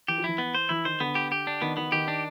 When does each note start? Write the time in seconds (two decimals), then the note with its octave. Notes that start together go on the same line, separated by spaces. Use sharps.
0.08 E3 G4
0.18 F3
0.24 E3 E4
0.38 B3
0.54 C5
0.69 E3 E4
0.85 D#3 C5
1.00 D3 B3
1.15 G4
1.32 G4
1.47 D4
1.62 D#3 B3
1.77 D#3 B3
1.92 D#3 G4
2.08 D4